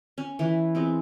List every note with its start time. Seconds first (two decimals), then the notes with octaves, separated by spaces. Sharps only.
0.18 C#4
0.39 E3 B4
0.75 G#3 B3 C4